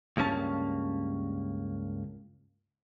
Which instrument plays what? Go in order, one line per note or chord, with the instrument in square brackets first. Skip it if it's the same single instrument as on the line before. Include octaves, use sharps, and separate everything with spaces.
[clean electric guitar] C#2 G2 A#3 C#4 A5